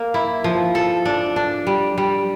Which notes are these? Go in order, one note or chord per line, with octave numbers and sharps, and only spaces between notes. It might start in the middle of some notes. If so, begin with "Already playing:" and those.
Already playing: A#3
E4
F3
A4
D4
D4
G3
G3